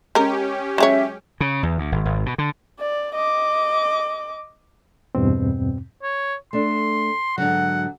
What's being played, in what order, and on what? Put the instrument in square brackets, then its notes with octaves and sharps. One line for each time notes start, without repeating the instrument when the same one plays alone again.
[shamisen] G#3 A#4 [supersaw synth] C#4 G4
[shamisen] F#3 G#3 C#5 [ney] E5
[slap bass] C#3
E2
D2
G#1
G#1
B2
D3
[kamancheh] D5
D#5 D6
[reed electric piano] E2 G2 B2 C4
[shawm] C#5
[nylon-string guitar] A3 D4 [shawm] C6
[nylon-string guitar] G#2 D3 F#3 [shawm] F#5